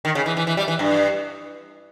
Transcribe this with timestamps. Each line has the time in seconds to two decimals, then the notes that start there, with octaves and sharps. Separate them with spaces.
0.05 D#3
0.15 C#3
0.26 E3
0.37 E3
0.47 E3
0.57 G3
0.68 E3
0.79 G2